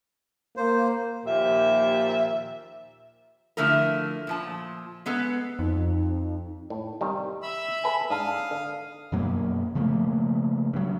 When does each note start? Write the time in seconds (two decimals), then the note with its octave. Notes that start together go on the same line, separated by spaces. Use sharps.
0.57 A#3 C5
1.26 D#2 A#2 F3 G4 E5
3.57 D3 F3 A3 E4 A#4
4.27 A#2 F3 A5
5.06 G#3 B3 A4
5.59 F2 D#4
6.70 A2
7.01 C3 D#3 G3
7.43 E5 B5 E6
7.84 A4 B4 G#5
8.10 G#2 D4 F5 A5 D#6
8.51 D3
9.12 F#2 B2 F#3 A#3
9.75 C#3 F3 A3 A#3
10.73 G2 F#3